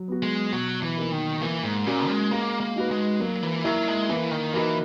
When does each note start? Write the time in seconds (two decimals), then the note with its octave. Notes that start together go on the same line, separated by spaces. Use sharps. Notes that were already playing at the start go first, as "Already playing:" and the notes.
Already playing: F#3
0.08 B3 F#4
0.23 G#3
0.52 B2 F#3
0.82 E3
0.97 A#3 D#4 A#4
1.12 D#3
1.41 E3 A#3
1.64 G#2
1.86 A#2 C#4 F#4 A#4
2.09 G#3
2.31 G#3 A#3
2.60 A#3
2.76 D#4 F#4 B4
2.91 G#3
3.20 F#3 A#3
3.42 E3
3.64 F#3 E4 A#4
3.88 G#3
4.09 E3 A#3
4.31 D#3
4.54 E3 D#4 F#4 A#4